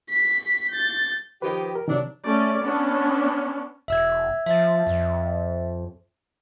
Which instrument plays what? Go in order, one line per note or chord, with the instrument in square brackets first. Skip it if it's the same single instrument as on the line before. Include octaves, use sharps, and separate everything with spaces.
[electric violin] B6
G6 A6
[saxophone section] D#3 F3 G4 [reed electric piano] B4
[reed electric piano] A#4
[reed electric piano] C3 D#3 [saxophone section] F#3 D4
[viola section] A3 C#4 D5
B3 C#4 D4
[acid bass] E1 [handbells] E5 E6 G#6
[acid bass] F3 [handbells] E5 A6
[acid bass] F2